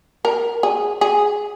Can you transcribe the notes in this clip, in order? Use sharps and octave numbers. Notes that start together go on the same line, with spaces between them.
A#4
G#4
G#4